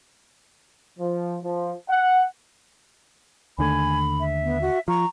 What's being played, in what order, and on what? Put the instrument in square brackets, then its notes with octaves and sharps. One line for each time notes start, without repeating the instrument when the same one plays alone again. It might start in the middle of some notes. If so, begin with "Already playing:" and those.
[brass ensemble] F3
F3
F#5
[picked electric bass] D#2 D3 A3 [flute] G#5 [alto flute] B5
[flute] E5
[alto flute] B3
F#4
[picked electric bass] F3 [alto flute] A#5 [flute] C#6